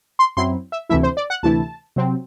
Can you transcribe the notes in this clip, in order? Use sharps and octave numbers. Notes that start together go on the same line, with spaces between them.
C6
F#2 F#3 C4 E4 C6
E5
D2 C3 E3 A3 E4 E5
C5
D5
F#5
D2 C3 E3 A3 E4 A5
C3 F#3 C4